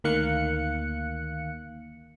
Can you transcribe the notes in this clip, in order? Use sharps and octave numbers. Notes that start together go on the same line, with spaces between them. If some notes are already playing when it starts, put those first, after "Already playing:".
D2 D#3 A#3 F5 F#6 C#7